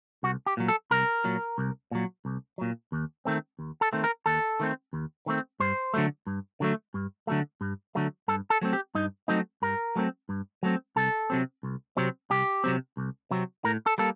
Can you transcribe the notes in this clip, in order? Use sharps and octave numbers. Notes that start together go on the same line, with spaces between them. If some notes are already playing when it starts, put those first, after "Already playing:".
C2 F#4
G4
A#2 F#3
A4
C2 A#4
A#2 F#3
C2
A#2 F#3
C2
A#2 F#3
D#2
D#3 A3 C4
D#2
A4
D#3 A3 C4
A#4
D#2 A4
D#3 A3 C4
D#2
D#3 A3 C4
G2 C5
D3 F#3 A3
G2
D3 F#3 A3
G2
D3 F#3 A3
G2
D3 F#3 A3
G2 A4
A4
F#3 A3 C4
G4
G2 D#4
F#3 A3 C4 D#4
G2 A#4
F#3 A3 C4
G2
F#3 A3 C4
C2 A4
C3 F#3 C4
C2
C3 F#3 C4
C2 G4
C3 F#3 C4
C2
C3 F#3 C4
A2 A#4
A4
G3 A#3 A4